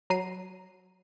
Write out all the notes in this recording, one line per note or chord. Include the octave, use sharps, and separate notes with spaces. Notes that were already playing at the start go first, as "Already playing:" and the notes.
F#3 A#5 C7 D#7